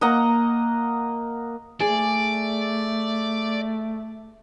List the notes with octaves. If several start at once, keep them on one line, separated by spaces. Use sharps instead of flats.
A#3 D#5 F#5 A#5
A3 G#4 D5